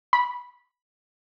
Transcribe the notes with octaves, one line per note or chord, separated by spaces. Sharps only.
B5